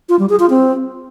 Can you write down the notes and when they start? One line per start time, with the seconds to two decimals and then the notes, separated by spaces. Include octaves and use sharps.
0.09 F4
0.19 G3
0.29 G#4
0.40 F4
0.50 C4